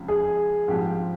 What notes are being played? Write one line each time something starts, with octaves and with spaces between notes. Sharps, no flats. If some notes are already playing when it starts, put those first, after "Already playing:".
Already playing: C#2 C3 F3
G#4
G#2 F3 C4 G4